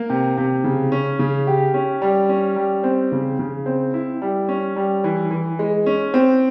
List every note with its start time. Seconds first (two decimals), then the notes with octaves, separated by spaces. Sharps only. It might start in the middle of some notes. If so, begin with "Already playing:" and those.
Already playing: A#3
0.10 C3
0.37 C3
0.64 C#3
0.92 C#4
1.19 C#3
1.47 G4
1.74 C#4
2.02 G3
2.29 C#4
2.56 G3
2.84 C4
3.12 C#3
3.39 C#3
3.66 C4
3.94 E4
4.22 G3
4.49 C#4
4.76 G3
5.04 E3
5.31 E3
5.59 G#3
5.86 C#4
6.14 C4